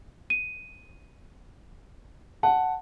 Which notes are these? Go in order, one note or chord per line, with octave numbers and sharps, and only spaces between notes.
D#7
F#5 A5